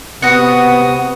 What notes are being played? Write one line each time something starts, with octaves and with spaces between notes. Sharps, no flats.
C3 B3 F#4 F#5 D#6